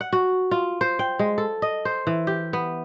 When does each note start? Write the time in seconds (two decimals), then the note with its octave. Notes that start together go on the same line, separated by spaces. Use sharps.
0.01 F#5
0.13 F#4
0.51 F4
0.81 C5
0.99 G5
1.19 G#3
1.38 A4
1.62 D#5
1.85 C5
2.07 E3
2.27 G4
2.53 B3